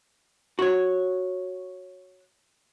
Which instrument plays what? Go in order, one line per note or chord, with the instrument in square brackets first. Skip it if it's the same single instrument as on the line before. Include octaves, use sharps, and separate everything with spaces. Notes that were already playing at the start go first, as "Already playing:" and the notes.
[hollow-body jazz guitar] F#4 C#5